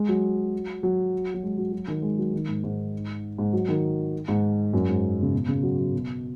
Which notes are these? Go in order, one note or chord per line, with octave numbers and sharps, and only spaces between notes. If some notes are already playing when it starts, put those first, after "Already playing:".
Already playing: G#3
F#3
F#3
F#3
G#3
F#3
F#3
D#3
G#3
F#3
D#3
G#2
G#2
G#2
F#3
D#3
G#2
F#2
G#2
C#3
B2
C#3
F#3
F#3
B2